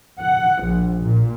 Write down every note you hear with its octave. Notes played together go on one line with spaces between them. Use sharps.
F#5
A#1
A#2